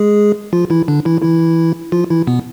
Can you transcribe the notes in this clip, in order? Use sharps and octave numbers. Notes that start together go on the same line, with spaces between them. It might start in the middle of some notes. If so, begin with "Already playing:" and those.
Already playing: G#3 G#4
F3 F4
E3 E4
D3 D4
E3 E4
E3 E4
F3 F4
E3 E4
B2 B3